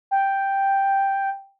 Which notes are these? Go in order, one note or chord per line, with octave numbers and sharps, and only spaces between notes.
G5